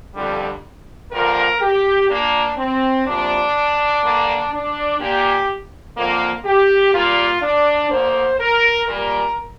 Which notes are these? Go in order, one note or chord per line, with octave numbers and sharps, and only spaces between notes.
F2 D3 G3
G2 D3 F3 A#3 A#4
G4
A#2 A#3 D4
C4
D2 C3 F3 A#3 D4
G2 D3 A#3
D4
A#2 A#3 G4
F2 D3 F3 A#3
G4
A#2 G3 A#3 F4
D4
D2 D3 A#3 C5
A#4
A#2 G3 A#3 A#4